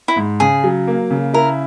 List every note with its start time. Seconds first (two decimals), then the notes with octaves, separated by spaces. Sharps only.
0.08 E4
0.16 G#2
0.40 C#3 G#4
0.64 F#3
0.87 A#3
1.10 C#3
1.34 E4 A#4